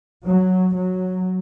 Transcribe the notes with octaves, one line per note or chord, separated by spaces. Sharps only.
F#3
F#3